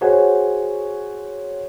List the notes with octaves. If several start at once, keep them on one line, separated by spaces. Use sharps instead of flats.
F#4 G#4 C5 C#5 F#5 G#5